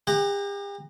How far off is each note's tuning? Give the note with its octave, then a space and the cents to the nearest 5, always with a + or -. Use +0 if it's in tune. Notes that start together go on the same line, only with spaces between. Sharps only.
G4 +45 F#5 +30 A#5 +0